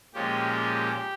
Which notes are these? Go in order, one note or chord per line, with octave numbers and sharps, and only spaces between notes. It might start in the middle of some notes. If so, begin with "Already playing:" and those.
A#2 F3 G#3 C#4 G4
G4